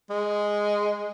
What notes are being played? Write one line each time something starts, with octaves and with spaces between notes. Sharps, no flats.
G#3